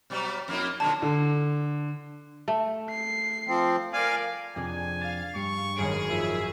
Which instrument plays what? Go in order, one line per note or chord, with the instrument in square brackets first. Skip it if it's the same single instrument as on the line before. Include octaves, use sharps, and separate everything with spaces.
[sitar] B2 F#3 G3
F2 A#3 D#4
[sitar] A#2 D3 F#3 [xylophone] A5
[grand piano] D3
[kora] A3
[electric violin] C7
[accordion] F3 C4
[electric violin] A#4 D5 [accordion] F5 G#5
[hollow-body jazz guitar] F2 C3 [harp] D4 G#4 [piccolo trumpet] G#5
[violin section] F5 [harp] A6 E7
[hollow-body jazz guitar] G2 [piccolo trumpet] C#6
[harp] G#1 F#2 D7 [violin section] G#4
[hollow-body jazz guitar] F3 D#4 [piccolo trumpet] E5